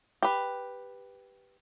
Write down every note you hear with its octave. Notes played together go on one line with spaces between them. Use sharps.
G4 B4